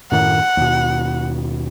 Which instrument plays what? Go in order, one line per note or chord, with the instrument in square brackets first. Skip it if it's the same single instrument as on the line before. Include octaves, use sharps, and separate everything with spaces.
[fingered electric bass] F#2 A2 D#3 [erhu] F#5
[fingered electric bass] D#2 B2